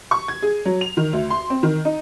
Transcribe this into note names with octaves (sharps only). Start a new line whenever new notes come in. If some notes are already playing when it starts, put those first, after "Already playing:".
C#6
G#6
G#4
F#3
F7
D#3
D2
C6
C4
D#3
D#4